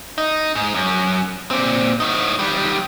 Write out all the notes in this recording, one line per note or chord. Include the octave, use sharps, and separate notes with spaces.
D#4
G#2
F#2
A#2 C4
A2 D#4
D#3 G3